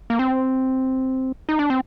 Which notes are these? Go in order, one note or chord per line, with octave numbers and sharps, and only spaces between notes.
A#3
C4
D#4
D4
C4